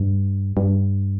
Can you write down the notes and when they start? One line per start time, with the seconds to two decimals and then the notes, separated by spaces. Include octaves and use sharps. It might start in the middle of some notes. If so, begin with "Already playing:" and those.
Already playing: G2
0.57 G2